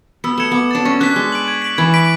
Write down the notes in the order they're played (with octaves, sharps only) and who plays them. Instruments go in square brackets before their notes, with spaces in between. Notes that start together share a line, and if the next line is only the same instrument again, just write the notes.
[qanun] B3 [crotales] E6
[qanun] A3 [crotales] G#6 C#7 E7
[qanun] B3 [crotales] D6
[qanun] D4 [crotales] A6 E7
[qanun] C#4 [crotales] C#6
[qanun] D4 [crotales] F#6 B6
[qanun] G#3 [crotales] G#6
[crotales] D7 F#7
G#6
B6 D7 F#7
[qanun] E3 [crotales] G#6
[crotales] B6 D7 F#7